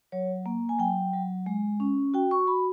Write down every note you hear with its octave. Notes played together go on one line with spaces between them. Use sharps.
F#3 C#5
A#3
G#5
F#3 G5
F#3
G#3
C#4
F#4 G5
C#6
F#4 B5